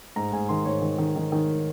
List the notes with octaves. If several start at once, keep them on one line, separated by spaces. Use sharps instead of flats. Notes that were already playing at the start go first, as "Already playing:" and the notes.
G#2 A#5
G#2 G#5
D#3 C6
G#2 C#5
D#3
D#3
D#3
D#3